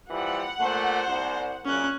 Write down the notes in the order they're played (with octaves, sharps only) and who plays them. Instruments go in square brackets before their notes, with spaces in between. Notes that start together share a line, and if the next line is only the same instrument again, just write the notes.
[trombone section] E3 F3 G3 [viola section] F#5
[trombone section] A#2 A3 [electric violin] C5
[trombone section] C2
[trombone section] F#2 A#2 C#3 [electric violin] C#4 F#6